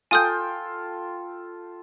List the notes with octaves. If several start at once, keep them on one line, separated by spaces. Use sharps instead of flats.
F4 A4 G5 G#5 D#6 G6